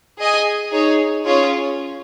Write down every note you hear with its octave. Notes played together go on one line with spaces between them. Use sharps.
G#4 D#5 G#5
D#4 G#4 C#5
C#4 F4 G#4 C#5